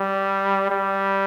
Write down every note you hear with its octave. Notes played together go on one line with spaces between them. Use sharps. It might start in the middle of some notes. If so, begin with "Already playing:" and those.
Already playing: G3
G3